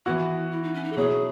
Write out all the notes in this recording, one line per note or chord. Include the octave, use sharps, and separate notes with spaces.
E3 B3 E4 F#4
E4
D#4
C#4
D#4
A4
B2 F#3 C#4 E4 G#4